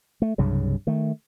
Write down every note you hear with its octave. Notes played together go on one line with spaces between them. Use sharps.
A3
C2 G2 C#3 F#3
D#3 A3